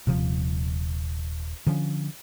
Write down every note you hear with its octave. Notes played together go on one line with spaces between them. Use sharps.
D#1 C3 F3
D3 F3 C#4